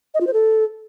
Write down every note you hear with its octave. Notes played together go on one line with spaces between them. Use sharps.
D#5
F4
C5
A4